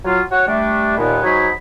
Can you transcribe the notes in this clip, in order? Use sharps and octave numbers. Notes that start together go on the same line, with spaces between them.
F#3 F4
F#4 C#5 F#5
G3 A3 D4
D#2 A#2 B3
G#2 F#3 D#4 G#4 C#5 B5